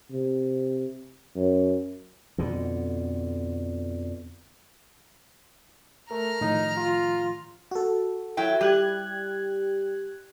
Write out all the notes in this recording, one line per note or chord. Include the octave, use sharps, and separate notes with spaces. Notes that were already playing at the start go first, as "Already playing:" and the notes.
C3
F#2
F2 B2 D3
A3 A#4 A#5 F6
A2 D#3 F3 D#4
F4
F#4 A4
F#3 E4 G5
G3 G4 F#6 G#6